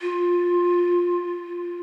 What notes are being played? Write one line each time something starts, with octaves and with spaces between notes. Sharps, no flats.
F4